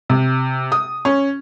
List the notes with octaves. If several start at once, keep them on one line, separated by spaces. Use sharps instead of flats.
C3
D#6
C#4